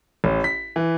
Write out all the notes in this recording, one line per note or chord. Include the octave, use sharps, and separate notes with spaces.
A1
B6
E3